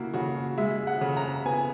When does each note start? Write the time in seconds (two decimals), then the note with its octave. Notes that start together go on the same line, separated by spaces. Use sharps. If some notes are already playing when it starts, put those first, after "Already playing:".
Already playing: C#3 A#3 E4 F#4
0.14 C#3 F#4
0.58 G#3 E5
0.87 F#5
1.01 C#3
1.17 A#5
1.45 B3 G#5